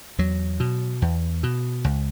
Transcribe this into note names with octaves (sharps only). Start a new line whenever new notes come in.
E2 F#3
B2
E2
B2
C#2